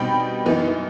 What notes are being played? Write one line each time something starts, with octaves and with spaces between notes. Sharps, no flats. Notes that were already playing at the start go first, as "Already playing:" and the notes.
Already playing: B2 G3 C4 D#4 G5 B5
F#2 E3 B3 D#4